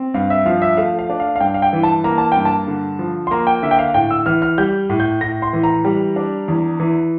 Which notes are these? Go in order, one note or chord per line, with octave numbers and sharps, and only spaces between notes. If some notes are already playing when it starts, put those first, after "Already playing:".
Already playing: C4
G2 F5
E5
F3 F5
E5
A3 F5
F5
D4
F5
F5
G2 G5
F5
G5
E3
A5
A#3 A#5
A5
G2 G5
A5
D3
F3
C6
A#3 A#5
G5
D3 E5
G5
F5
A2 G5
E6
E3 F6
F6
G3 G6
A2
G6
A2 A#6
C6
E3
A#5
G3
D4
E2
E3